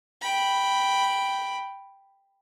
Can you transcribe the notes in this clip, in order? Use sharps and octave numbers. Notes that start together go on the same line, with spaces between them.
G5 B5